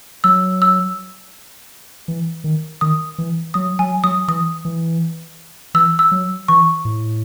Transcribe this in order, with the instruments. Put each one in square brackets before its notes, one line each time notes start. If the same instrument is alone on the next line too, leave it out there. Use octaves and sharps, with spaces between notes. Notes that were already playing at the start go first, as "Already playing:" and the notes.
[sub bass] F#3 [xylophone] E6
[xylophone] E6
[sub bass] E3
D#3
[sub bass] D#3 [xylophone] D#6
[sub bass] E3
[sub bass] F#3 [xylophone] D#6
[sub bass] F#3 [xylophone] G#5
[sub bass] F#3 [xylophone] D#6
[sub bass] E3 [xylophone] D#6
[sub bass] E3
[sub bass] E3 [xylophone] E6
[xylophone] E6
[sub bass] F#3
[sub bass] E3 [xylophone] C#6
[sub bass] A2